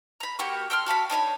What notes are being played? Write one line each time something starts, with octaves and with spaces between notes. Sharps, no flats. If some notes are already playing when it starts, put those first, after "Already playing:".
A#5 B5
A#3 F#4 G4 C#6
A4 G5 C6 F6
F#4 A4 F5 B5
D4 D#4 C#5 B5